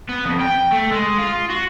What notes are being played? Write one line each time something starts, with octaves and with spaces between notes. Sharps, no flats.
B3
F2
G5
A3
G#3
F4
F#4